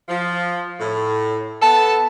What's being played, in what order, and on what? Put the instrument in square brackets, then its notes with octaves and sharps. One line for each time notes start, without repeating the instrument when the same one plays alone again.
[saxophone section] F3
A2
[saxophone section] B3 A4 [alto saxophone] A5